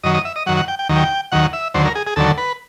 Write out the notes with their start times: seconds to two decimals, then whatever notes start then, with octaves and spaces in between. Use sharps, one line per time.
0.03 F#2 D#3 F#3 D#5
0.14 D#5
0.25 E5
0.36 D#5
0.46 F#2 D#3 F#3 F#5
0.57 F#5
0.68 G5
0.79 G5
0.89 D#2 D#3 F#3
0.96 G5
1.32 D#2 D#3 F#3 F#5
1.53 E5
1.74 D#2 D3 F#3 C5
1.85 A#4
1.95 G#4
2.07 G#4
2.16 D#2 D3 F#3 A4
2.38 B4